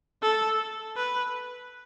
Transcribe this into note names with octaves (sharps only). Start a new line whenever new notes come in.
A4
B4